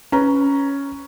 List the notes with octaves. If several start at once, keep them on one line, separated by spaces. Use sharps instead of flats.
C#4 B4 A#5